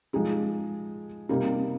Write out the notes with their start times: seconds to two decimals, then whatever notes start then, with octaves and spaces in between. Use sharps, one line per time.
0.13 F3 G#3 D#4 G#4
1.29 C3 G3 A#3 D#4